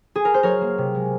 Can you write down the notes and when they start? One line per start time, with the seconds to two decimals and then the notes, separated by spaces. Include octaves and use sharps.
0.15 G#4
0.25 A#4
0.34 C5
0.43 F#3 A#4 C#5
0.61 A#3
0.78 C3
0.95 G#3